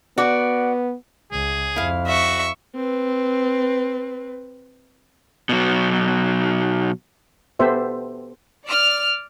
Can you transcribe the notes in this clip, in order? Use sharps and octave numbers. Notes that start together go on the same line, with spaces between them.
B3 F#4 D5
C#2 G#4
F2 E4 F5
F#4 E5 C#6
C4 B4
B2 F#3
B3 G4 A4 C5 E5
D5 F6